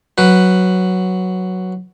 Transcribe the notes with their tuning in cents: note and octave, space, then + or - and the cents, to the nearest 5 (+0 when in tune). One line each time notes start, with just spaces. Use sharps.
F#3 +0 B4 +0